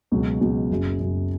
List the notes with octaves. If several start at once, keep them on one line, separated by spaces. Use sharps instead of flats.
C#2 B2 F#3
C#2 B2 F#3
F#1 F#2 C#3 F#3
F#1 F#2 C#3 F#3